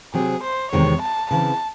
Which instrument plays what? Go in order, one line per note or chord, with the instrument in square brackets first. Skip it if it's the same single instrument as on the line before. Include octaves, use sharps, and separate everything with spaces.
[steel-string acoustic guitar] C3 F#3 C4 [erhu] G#4
[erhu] C5
[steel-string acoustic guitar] E2 C3 D#3 G#3 C4 [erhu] C#5
[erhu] A5
[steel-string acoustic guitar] C#3 E3 C4 [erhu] A5